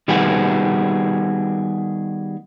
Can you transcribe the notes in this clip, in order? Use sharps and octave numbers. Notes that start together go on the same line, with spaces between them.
D#3 G3 B3 F#4 G#4